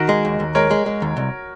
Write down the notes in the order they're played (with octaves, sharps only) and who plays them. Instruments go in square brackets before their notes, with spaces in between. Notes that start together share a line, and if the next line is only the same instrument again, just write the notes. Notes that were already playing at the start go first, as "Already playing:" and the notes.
Already playing: [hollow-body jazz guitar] D#3 [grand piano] F#4 A#4
[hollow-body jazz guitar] G#3
D#2
D#2
[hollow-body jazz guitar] G#3 [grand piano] A#4 C#5
[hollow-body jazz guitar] G#3
G#3
D#2
C2